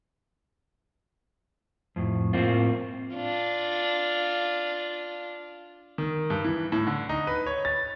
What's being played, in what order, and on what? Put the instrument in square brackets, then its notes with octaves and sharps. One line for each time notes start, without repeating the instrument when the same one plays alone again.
[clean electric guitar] F2 A2
A2 A#3 C4 F4
[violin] D4 F4
[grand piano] D#3
G2
E3
A2
D3
D#4
B4
C#5
A6